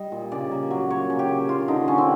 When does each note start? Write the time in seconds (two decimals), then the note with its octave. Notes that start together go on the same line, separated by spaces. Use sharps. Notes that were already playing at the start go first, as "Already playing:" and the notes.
Already playing: G3 D#5
0.12 A#2
0.32 C#3 D5
0.51 A#3
0.70 F#3
0.90 A#3 C#5
1.10 C#3
1.19 G4
1.29 A#3
1.49 A#3 F4
1.68 D3 D#4
1.88 D3 C#4
1.98 C4